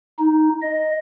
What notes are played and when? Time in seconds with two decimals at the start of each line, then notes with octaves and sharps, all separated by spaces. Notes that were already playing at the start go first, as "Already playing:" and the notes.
0.19 D#4
0.62 D#5